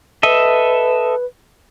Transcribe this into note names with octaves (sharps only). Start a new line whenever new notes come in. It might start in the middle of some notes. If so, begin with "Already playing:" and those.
A4 B4 D#5 E5